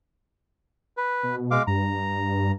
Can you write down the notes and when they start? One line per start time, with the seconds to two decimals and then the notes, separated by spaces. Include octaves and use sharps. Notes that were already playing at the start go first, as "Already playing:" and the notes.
0.97 B4
1.23 B2
1.51 G#3 F5 D6
1.67 G2 A#5